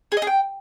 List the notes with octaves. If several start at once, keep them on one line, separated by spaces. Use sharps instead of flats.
G#4
D#5
G#4
G5